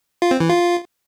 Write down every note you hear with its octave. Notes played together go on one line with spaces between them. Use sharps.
F4
C4
E3
F4